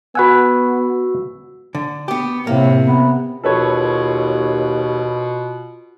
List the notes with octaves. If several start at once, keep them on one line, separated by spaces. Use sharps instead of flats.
B3 F#4 B4 F#5 G#5 E6
D3
B3 G4
A2 C3 A#3
B3
D#2 B2 F4 A4 B4 C#5